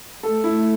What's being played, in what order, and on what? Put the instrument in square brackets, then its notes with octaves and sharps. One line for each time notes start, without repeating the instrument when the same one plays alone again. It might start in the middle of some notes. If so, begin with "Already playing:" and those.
[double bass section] A3 [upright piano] A4
[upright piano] E4